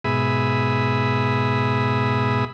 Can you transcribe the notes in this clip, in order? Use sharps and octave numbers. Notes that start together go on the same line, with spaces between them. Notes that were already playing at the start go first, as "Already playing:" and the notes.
G#2 B2 G#4 E5 B5 D#6